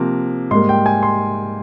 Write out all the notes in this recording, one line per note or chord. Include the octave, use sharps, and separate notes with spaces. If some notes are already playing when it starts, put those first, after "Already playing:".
Already playing: C3 F3 A#3
G#2 G3 A#3 C6
G5
G#5
C6